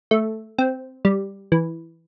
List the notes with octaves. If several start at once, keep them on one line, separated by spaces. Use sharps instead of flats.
A3
C4
G3
E3